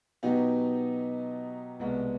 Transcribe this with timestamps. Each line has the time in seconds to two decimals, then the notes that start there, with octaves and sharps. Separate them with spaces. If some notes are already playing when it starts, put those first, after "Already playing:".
0.23 B2 F#3 B3 D#4 G4
1.80 C2 B2 G#3 B3